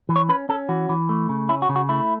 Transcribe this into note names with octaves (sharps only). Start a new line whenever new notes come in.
E3
C#5
C#4 B4
C#4 A4
E3 F#4
E3
A3
C#3
C#4 E4
F#4
C#3
F#4
A3 E4